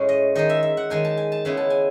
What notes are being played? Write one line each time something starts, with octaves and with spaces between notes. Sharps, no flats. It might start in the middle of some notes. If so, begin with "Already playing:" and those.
Already playing: A2 G#3 C#4
D#5
D#3 G#3 D#4 D#5
E5
E5
F#5
D#3 G#3 D#4 G#5
A5
G#5
A5
C#3 G#3 B3 E4 B5
A5
G#5